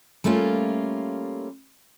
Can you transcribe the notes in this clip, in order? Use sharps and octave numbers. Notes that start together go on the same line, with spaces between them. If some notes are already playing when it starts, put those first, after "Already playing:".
G3 A3 A#3 C#4 F4